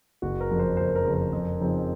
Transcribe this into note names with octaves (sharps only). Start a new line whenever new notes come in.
F#1 F#4
A#4
F2 C#3 F3
C5
F#1 C5
A#4
F2 C#3 F3
A#4
F2
C#3 F3 C4 D#4